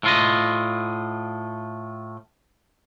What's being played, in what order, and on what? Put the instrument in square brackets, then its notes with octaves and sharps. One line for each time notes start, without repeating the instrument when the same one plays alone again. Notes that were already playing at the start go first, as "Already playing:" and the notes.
[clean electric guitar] A2 F4 D#5